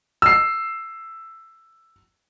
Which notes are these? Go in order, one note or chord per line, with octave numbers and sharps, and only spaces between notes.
E6 C7